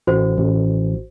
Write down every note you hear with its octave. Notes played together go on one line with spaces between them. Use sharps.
A1 F#4 C5
A1